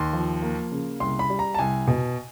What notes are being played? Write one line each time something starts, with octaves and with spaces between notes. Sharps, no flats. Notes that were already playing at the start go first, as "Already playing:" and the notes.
Already playing: D#2 C6
F3
A#3
C#3
C2 C6
B5
G3
A#5
A5
C2 G#5
B2